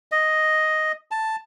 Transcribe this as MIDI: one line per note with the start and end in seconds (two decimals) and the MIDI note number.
0.12 0.92 75
1.11 1.36 81